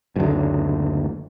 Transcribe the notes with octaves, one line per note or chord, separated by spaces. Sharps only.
F#1 D2